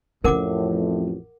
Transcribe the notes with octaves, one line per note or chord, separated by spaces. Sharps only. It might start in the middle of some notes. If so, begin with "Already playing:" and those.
A1 F2 A2 F3 C#4 A#4 F#5 D6